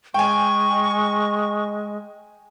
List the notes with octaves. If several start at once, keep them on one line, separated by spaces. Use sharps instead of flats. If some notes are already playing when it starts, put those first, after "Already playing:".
G#3 G5 G#5 C#6